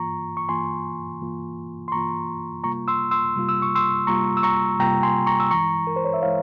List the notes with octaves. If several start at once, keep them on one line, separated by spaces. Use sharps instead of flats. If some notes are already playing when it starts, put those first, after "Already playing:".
Already playing: G2 E3 A#3 F4 A#5 C#6
C#6
G2 E3 A#3 F4 G#5 C6
G2 E3 A#3 F4
C6
G2 E3 A#3 F4 A#5 C#6
C3 G3 A#3 F4 A#5 C#6
C6 E6
C6 E6
C3 G3 A#3 F4
E6
C#6
C6 E6
C3 G3 A#3 F4 A#5 C#6
E6
A#5 C#6
C3 G3 A#3 F4 G5 A#5
G#5 C6
A#5 C#6
E6
G2 E3 G#3 E4 A#5 C#6
A#4
C5
C#5
E5
E3 G#3 E4 C#5 F5